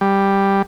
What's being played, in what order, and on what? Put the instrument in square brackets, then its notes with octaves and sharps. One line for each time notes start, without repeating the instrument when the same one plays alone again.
[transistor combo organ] G3